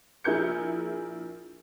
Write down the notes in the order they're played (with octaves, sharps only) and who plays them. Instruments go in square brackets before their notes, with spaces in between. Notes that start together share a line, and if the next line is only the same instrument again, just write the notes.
[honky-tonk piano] A#1 E4 G#4 A#4 G6 C#7